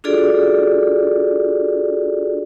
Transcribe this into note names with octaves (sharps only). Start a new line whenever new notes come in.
D4 F4 F#4 G#4 A4 D5